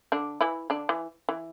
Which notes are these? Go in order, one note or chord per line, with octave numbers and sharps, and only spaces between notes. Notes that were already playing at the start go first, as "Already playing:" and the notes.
D3 D4
E3 E4
D3 D4
E3
E3